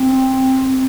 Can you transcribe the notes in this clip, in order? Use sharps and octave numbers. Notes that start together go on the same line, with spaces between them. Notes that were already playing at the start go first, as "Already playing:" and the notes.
Already playing: C4